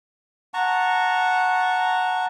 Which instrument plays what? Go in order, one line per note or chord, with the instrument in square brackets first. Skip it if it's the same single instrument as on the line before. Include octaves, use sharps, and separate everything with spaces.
[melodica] F#5 A5 A#5 C#6